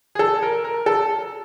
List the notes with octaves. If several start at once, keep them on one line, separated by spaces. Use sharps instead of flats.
G#4
A4
A#4
A#4
A4